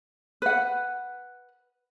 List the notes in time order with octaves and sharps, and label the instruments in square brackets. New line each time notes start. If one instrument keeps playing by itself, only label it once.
[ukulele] B4 F#5